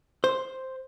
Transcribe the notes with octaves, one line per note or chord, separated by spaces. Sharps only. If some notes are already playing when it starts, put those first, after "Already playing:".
C5